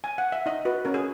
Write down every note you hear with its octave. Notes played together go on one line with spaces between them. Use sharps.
G#5
F#5
E5
D#4 D#5
F#4 B4
C#4 A#4
G#4